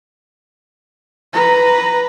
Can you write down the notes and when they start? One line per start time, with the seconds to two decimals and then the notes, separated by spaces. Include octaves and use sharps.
1.34 B4 A#5